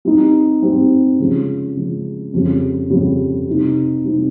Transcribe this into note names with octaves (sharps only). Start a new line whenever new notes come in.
G3 C4 D#4 G4
G3 C4 D#4 G4
C#3 F3 G#3
C#3 F3 G#3
F2 C#3 G3
F2 C#3 G3
C3 G3 C4 D#4
C3 G3 C4 D#4